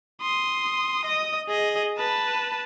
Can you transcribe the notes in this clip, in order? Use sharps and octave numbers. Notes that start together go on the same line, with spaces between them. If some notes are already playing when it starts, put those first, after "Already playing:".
C6 D#6
D#5 D#6
G#4 D#5
B4 A5